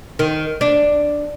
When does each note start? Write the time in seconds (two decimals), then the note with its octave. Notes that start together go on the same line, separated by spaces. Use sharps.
0.19 D#3
0.61 D4